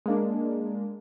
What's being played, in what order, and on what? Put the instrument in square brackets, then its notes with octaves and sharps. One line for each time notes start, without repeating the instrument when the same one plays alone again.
[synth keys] G#3 A#3 D4